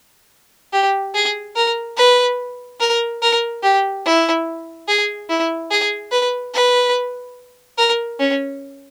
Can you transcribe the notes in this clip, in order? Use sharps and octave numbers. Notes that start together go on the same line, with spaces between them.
G4
G#4
A#4
B4
A#4
A#4
G4
E4
G#4
E4
G#4
B4
B4
A#4
C#4